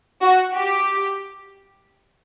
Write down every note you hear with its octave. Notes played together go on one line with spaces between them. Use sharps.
F#4
G4